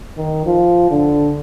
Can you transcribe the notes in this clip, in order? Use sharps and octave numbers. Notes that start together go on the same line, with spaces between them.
D#3
F3
D3